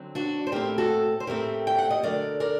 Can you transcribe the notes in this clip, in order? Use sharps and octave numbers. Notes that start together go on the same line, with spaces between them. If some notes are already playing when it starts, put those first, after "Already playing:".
Already playing: D3 F#3 C4
D4 F#4
C5
A2 A3 C4 G4 A#4
F#4 A4
C5
A2 A3 C4 G4 A#4
G5
F#5
D#5
D3 F#3 A3 A#4 D5
A#4 D5